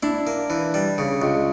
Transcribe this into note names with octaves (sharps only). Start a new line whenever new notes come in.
D4 E4
A#3
E3
G3
C#3
C#2